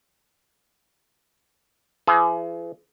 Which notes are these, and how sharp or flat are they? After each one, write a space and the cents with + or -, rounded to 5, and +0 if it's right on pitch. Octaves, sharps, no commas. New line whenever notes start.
E3 +45 G#4 +30